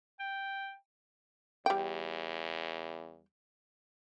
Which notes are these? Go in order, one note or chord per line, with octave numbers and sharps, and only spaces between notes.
G5
E2 G3 G5